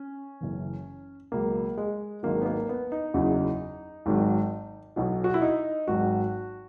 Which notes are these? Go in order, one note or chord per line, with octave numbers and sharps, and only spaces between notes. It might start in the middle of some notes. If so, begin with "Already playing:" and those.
Already playing: C#4
F#1 F#2 E3
C#2 B2 F#3 A#3
G#3
G#1 G#2 D#3 F#3 A#3
B3
A#3
B3
D#4
F#1 E2 C#3 F#3
G#1 G#2 D#3 F#3
B1 B2 F#3
F#4
E4
D#4
G#1 G#2 F#3 F#4